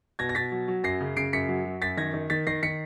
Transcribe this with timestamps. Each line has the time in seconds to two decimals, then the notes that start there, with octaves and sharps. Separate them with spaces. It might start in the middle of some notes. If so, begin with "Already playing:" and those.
0.19 B2 G#6 A#6
0.29 A#6
0.35 B2 A6 B6
0.52 F#3
0.68 F#3
0.84 F#2 A#6 C7
1.01 C#3
1.16 C#3 C7 D7
1.33 F#2 B6 C#7
1.49 F#3
1.65 F#3
1.82 F#2 A6 B6
1.97 D#3 G#6 A#6
2.14 D#3
2.30 D#3 A6 B6
2.47 D#3 A#6 C7
2.63 D#3 B6 C#7